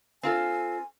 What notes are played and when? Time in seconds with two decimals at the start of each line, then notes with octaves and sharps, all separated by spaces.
0.23 C4 F4 A4 G#5